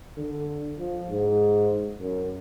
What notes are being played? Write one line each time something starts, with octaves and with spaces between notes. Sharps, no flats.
D3
F3
G#2
F#2